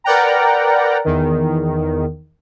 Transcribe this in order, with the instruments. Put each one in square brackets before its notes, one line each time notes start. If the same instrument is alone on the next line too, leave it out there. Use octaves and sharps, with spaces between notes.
[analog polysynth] A#4 B4 D5 F#5 G5 A#5
E2 D#3